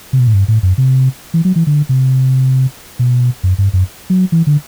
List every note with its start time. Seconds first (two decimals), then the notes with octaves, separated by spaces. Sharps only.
0.13 C3
0.19 B2
0.27 A2
0.34 G2
0.48 A2
0.63 F#2
0.78 C3
1.34 E3
1.45 F#3
1.56 E3
1.67 D3
1.89 C3
2.99 B2
3.43 F#2
3.58 G2
3.73 F#2
4.10 F#3
4.32 E3
4.47 D3